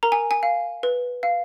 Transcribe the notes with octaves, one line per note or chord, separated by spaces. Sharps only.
A#4 A#5
G#5
G#5
F5
B4
F5